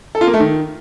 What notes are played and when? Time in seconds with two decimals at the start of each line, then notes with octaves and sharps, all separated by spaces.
0.15 A4
0.21 F4
0.27 A#3
0.34 A3
0.40 D#3